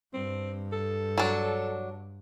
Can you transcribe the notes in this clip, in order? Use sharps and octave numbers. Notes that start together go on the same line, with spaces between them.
G2 C4
A4
F#3 D4